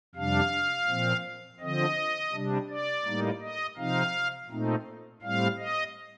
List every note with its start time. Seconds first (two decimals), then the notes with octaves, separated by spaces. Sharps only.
0.15 F2 C3 G3 D4 F5
0.88 A#2 F3 C4
1.60 D3 F3 C4 D#5
2.32 C3 G3 D4
2.69 D5
3.05 A2 G3 A#3 D#4
3.41 D#5
3.77 C3 F3 C4 D#4 F5
4.50 A#2 A3 C4 D#4
5.22 A2 G3 C4 F5
5.58 D#5